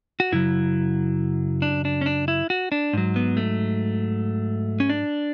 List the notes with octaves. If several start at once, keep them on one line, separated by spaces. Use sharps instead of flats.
F#4
F#2 C#3 F#3 E4
D4
D4
C#4
D4
E4
F#4
D4
G#2 F#3
B3
A3
C#4
D4